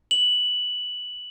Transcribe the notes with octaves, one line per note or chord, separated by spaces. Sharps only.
F#7